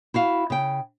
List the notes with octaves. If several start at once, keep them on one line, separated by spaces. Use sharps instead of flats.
E4 F#4 F5
C#3 G5